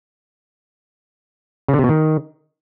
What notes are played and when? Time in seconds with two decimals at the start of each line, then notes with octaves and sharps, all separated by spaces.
1.68 C#3
1.74 D3
1.79 C3
1.84 B2
1.89 D#3